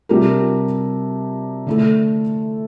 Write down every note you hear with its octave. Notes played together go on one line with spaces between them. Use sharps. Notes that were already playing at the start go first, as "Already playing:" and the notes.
C3 G3 D4 G4 A#4
D3 A3 E4 A4